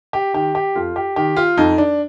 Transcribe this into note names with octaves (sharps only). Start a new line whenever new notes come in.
G4
D#3 G4
G4
F2 F4
G4
D#3 G4
F4
F2 D#4
D4